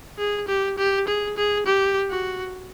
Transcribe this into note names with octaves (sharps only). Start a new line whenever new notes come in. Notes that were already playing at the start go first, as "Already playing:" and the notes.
G#4
G4
G4
G#4
G#4
G4
F#4